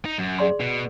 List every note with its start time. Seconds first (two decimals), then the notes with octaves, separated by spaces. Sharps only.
0.05 D#4
0.18 F#2
0.39 G#4 D5 C6
0.60 B2